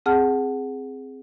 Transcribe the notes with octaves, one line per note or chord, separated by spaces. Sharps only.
C4 G#4 F#5 A5 F6